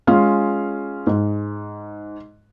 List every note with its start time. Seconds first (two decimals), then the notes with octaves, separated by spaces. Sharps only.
0.07 G#3 C#4 F4 F5
1.07 G#2